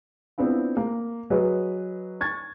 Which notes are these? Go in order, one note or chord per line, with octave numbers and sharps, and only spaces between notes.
B3 C4 D4 E4 F4
A#3
F#3 G#4 B4 D#5
C#6 G#6 A6